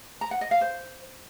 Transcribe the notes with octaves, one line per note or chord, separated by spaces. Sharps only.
A#5
F#5
D#5
F5
C5